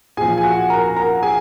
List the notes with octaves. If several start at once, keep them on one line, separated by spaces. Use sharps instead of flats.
A#2 F3 G#4 G#5
G#5
F#4 F#5
A#4 A#5
A#4 A#5
G#4 G#5